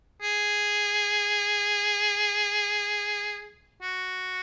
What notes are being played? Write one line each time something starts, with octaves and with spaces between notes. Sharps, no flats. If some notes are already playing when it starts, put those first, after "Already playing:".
G#4
F#4